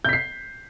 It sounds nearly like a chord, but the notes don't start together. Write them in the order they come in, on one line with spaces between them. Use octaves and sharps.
G6 B6 C7